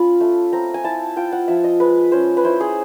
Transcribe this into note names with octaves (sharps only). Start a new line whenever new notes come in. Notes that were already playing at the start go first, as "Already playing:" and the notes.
Already playing: C#4 F4 B5
A3
C4 A#5
G#5
E4 A5
F4 G5
F#5
F3 E5
D#5
G#3 B4
C#4 C5
B4
E4 C5
G#4